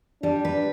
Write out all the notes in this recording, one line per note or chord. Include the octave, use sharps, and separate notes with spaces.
G3 D4
B4